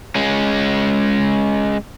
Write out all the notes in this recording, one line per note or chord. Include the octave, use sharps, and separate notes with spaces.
G#3 C#4